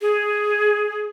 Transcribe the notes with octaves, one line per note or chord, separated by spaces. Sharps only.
G#4